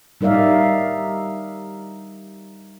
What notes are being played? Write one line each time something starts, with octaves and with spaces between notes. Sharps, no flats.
G3 D#4 A#4 D5 E5 F5